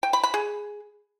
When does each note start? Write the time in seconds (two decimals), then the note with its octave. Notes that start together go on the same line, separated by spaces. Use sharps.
0.03 G5
0.13 B5
0.23 B5
0.34 G#4